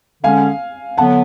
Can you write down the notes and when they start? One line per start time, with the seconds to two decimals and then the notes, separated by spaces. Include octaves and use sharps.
0.23 D3 G#3 C#4 F5 G#5
0.98 D3 F#3 B3 F#5 A5